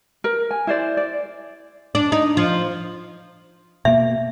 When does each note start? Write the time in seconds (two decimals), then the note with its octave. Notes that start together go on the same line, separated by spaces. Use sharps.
0.24 A#4
0.51 G#5
0.67 E4 C5 D5
0.97 D5
1.95 D4
2.12 D#4
2.37 F3
3.85 B2 A#3 E5